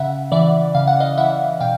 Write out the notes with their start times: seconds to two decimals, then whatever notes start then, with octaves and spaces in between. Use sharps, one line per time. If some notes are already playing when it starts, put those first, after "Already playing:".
Already playing: C#3 E5 F#5
0.32 E3 D5 E5
0.75 C#3 F5
0.88 F#5
1.00 D#5 F5
1.18 E3 E5 F#5
1.60 B2 F5 G5